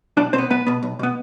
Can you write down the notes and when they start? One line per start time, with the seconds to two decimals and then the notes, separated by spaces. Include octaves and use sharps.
0.17 B1 D4 D5
0.33 B2 C4 C5
0.38 B3
0.50 B1 B3 B4
0.67 B2 B3
0.83 B1
0.99 B2 B3